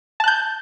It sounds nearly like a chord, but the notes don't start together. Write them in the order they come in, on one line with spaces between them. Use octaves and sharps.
A5 F#6 G6